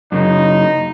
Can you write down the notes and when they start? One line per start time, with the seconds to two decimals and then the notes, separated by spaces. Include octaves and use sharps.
0.12 F#2 C#3 D#4